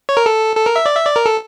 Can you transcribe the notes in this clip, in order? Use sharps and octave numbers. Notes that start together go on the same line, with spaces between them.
C#5
A#4
A4
A4
A#4
E5
D5
E5
D5
A#4
A4